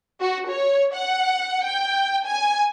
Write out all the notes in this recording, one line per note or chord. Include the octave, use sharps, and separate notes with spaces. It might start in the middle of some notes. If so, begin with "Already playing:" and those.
F#4
C#5
F#5
G5
G#5